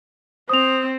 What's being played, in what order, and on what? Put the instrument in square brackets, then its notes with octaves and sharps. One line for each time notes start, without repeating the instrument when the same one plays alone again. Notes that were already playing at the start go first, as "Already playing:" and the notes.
[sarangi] C4 [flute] C5 [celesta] D#6 F7